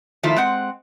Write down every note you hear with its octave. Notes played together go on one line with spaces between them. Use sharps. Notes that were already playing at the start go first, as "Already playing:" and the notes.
D#3 F3 A3 E4 F4
G#3 C4 F#5